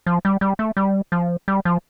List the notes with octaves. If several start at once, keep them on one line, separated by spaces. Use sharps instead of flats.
F3
G3
G3
A3
G3
F3
G3
F3